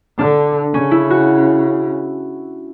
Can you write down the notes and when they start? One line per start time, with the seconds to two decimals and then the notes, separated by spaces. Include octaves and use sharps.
0.18 D3 D4
0.73 C#3 C#4
0.91 E4
1.10 F#4